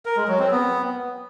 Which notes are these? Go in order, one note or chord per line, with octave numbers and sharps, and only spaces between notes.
A#4
G#3
F#3
C4
B3